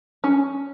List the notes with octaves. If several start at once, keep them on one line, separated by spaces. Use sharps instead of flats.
C#4